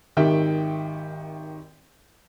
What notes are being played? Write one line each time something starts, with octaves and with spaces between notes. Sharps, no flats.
G#1 D#3 G4 E5 G5